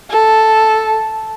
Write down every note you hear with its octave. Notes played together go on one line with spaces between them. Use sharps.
A4